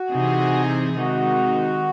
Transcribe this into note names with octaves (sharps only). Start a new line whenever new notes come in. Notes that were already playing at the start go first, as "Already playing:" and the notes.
Already playing: F#4
C3 E3 C4 D#4 G#4
C3 D#3 G#3 D#4 F#4